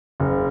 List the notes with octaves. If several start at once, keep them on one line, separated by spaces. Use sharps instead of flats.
F#1